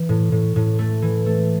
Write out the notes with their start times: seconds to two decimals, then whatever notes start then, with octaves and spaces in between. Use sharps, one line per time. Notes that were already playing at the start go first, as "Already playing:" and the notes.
Already playing: E3
0.09 A2
0.32 A2
0.56 A2
0.79 A3
1.02 E3
1.26 A3